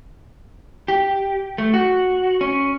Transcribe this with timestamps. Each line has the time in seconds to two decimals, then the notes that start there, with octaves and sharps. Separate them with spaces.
0.88 G4
1.58 A3
1.74 F#4
2.41 C#4